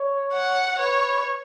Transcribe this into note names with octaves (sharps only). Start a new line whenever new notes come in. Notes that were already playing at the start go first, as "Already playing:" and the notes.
Already playing: C#5
F#5
B4 C#5